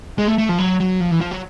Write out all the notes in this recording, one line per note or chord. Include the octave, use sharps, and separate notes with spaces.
G#3
A3
A3
F3
F#3
F#3
F3
E3
F3
F#3